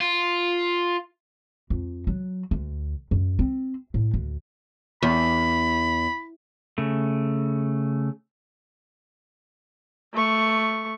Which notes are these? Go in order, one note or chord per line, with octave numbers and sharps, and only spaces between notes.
F4
F2
F#3
D2
F#2
C4
A2
D2
E2 B5
C#3 A3
A3 C#6